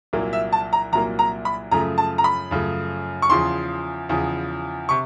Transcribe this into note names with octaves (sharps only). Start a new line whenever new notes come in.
C2 A#2 F#3 A#3
E5
A5
A#5
C2 A#2 F#3 A#3 A#5
A#5
B5
F#2 C#3 F3 A3 A#5
A5
A#5
B5
F#2 C#3 F3 A3
C#6
E2 C#3 F3 C6
E2 C#3 F3
C3 C#6